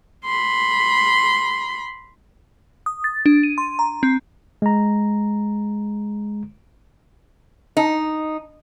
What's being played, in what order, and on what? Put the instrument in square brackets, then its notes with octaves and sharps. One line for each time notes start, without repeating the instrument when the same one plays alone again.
[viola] B5 C6
[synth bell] D#6
A6
D4
D#7
C6
A#5
C4
[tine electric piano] G#3 A#5
[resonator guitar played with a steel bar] D#4